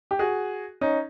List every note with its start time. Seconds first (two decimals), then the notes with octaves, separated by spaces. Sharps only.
0.11 G4
0.19 F#4 G#4
0.81 C#4 D#4